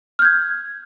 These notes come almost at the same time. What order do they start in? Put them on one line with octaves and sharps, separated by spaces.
F6 G6 G#6